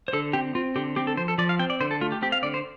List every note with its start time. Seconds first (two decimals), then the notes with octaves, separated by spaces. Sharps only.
0.08 C5
0.13 D3 A4
0.33 C4 G4
0.55 C4 F4
0.76 D3 G4
0.96 C4 G4
1.07 A4
1.17 F3 C5
1.28 A4
1.38 F3 D5
1.49 F5
1.59 C4 G5
1.70 D5
1.80 D3 C5
1.91 A4
2.01 A3 F4
2.12 G4
2.22 C4 G4
2.32 F5
2.43 D3 D5
2.54 C5